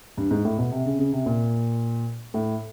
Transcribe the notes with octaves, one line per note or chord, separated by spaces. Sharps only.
G2
G#2
A2
B2
C3
C#3
C#3
C3
A#2
A2